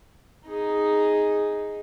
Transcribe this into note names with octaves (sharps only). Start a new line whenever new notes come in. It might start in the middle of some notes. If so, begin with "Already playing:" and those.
D#4 G#4